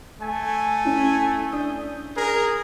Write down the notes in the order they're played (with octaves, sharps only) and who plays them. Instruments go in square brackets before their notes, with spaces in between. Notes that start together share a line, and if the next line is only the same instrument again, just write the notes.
[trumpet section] A3 G#5
[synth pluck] C#4 E4
D4 D#6 G6
[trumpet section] G#4 A#4